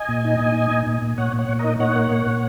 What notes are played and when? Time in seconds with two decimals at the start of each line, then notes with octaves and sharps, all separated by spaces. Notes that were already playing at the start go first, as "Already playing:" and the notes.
Already playing: D#5 G#5
0.09 A#2
0.25 D#4
0.40 A#2
0.56 D#4
0.71 A#2
0.87 A#2
1.02 A#2
1.18 A#2 C#5 F#5
1.33 A#2
1.39 C#5 F#5
1.49 A#2
1.59 A#4 D#5
1.64 D#4
1.80 A#2 C#5 F#5
1.96 A#3
2.11 A#2
2.26 A#2